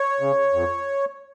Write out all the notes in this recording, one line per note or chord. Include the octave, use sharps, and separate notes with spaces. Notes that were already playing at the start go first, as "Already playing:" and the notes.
Already playing: C#5
C#3
F2